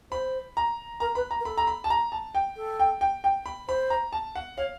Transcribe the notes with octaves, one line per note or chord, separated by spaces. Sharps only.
C5 B5
A#5
A#4 A#5
B4 B5
A#5
A#4
A4 B5
A#5
B5
A5
A#5
A5
G5
A4
G5
G5
G5
B5
C5 B5
A#5
A5
F#5
C#5 F5